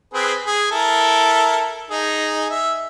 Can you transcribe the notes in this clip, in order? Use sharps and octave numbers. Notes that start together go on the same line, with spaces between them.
C4 G#4 B4
G#4
E4 A4 A#4
D#4 G#4
E5